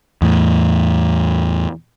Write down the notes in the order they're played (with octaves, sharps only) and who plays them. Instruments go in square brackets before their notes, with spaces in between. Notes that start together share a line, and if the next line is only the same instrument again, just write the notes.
[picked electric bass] E2 A2